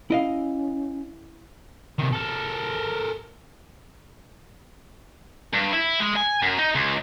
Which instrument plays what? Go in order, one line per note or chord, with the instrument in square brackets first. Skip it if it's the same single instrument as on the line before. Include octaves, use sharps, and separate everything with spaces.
[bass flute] C#4 [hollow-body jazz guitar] E4 D#5 F5
[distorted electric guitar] C3 D#3
A4 A#4
G2
E4
G#3
G#5
F#2
D#4
C#2